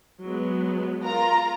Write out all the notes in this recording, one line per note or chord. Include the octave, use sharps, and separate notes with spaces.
F#3 G#3 B3
F4 A#4 A#5